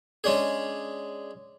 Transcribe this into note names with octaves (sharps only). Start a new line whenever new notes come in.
G#3 C#4 D4 G#4